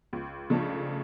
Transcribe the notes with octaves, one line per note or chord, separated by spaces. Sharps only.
C#2
C#3 F3 A3 D4